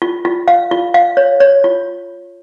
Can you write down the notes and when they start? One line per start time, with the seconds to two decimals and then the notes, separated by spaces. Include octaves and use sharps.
0.02 F4
0.25 F4
0.48 F5
0.71 F4
0.94 F5
1.17 C#5
1.40 C#5
1.64 F4